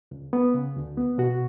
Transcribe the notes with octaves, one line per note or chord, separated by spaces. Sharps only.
C#2
B3
C#3
D2
B3
B2 F#4